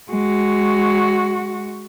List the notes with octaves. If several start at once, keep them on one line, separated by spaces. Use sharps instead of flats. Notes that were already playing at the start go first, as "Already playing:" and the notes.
G#3 F#4